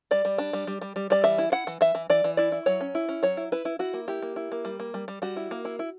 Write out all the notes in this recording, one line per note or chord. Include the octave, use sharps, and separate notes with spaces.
G3 D5
G3
D4
G3
G3
G3
G3
G3 D5
E3 E5
E4
E4 F#5
E3
E3 E5
E3
E3 D5
E3
E4 D5
E4
F#3 C#5
C#4
E4
C#4
F#3 C#5
E4
E4 B4
E4
E4 F#4
A#3
E4 G4
A#3
E4
A#3
G3
A#3
G3
G3
G3 F#4
E4
A#3
E4
E4